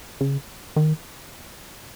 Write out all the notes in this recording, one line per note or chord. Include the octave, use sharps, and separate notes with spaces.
C#3
D#3